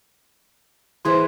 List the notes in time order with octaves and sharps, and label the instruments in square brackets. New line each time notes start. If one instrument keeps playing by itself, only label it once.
[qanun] E3 G#4 B4 [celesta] C5 C6